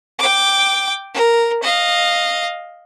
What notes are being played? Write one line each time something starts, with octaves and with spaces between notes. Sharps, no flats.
G5 D6
A#4
D#5 F5